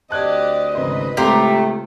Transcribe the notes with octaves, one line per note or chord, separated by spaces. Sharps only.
D2 C4 G4 D5 D#5 A5 F#6 G#6
G#1 C#3 B4 C5
C#2 A2 A3 B3 C4 G4 A#5 C6